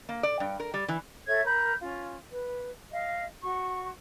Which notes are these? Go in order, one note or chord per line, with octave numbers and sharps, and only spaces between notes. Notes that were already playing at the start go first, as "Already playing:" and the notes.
A#3
D5
G2
A#4
G3
E3
A4 C#5 E5 G#6
A#4 B5 G6
C#4 F4
B4
D#5 F5
F#4 C#6